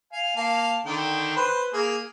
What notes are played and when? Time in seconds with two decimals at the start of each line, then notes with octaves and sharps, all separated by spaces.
0.13 F5 G#5
0.36 A#3 F5 A5
0.86 D3 D#3 G5
1.37 B4 C5
1.74 A#3 G#4